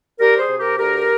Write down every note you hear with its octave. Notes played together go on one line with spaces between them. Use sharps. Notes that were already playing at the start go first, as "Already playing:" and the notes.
G3 G4 A#4
G#4 C5
C3
G4 A#4
D2 G4 A#4